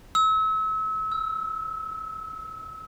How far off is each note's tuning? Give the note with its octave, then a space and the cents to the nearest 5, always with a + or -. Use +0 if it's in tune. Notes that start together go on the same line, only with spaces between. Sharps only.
E6 -35
E6 +10